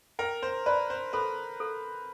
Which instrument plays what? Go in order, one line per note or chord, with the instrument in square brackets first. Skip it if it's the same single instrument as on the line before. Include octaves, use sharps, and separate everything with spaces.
[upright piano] A#4 [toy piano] G5
[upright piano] C5
[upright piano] B4 [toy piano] D5
[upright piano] C5
[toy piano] A4 [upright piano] B4
[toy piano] A4